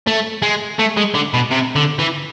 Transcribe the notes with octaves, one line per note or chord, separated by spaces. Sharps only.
A3
G#3
A3
G#3
D3
B2
C3
D3
E3